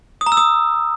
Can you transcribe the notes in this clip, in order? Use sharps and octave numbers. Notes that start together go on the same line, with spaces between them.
D#6
A#5
E6
D#6